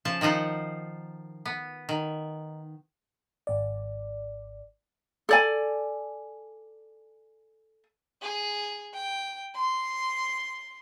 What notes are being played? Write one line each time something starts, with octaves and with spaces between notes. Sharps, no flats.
C#3 F3 A5
D#3 F3 D#4 F4 F#5
B3
D#3
G#1 D5
A4 D5 G#5
G#4
G5
C6